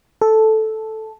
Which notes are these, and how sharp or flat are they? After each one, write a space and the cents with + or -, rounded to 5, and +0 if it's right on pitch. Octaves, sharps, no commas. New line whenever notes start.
A4 -5